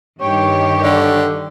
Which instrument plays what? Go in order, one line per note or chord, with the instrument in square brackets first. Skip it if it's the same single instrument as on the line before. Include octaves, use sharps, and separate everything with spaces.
[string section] G2 D#3 G4 [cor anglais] C#5
[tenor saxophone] D3